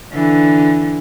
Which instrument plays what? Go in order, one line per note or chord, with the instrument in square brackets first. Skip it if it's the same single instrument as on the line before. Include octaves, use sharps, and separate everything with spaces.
[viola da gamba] D3 E3